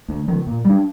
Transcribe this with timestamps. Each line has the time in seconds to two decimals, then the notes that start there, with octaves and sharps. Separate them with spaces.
0.09 D2
0.28 C#3 F3
0.47 A#2
0.65 G3 D4